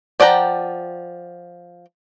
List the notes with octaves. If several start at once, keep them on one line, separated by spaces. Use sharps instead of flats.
F3 D5 F#5 G5 A#5